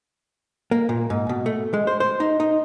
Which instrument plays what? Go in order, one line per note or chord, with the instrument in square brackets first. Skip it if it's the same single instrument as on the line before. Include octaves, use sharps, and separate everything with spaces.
[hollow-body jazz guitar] A#3
A#2
G#2
B2
A3
G#3
C5
C5
D#4
D#4